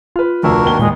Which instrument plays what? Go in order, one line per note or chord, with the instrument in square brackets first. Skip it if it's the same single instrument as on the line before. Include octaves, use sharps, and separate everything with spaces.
[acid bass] F4 [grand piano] B4 F6
[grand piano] F1 D2 E6 [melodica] D4 F#4 A#4
[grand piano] G#1 D#2 G7
[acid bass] A#2 [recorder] G#3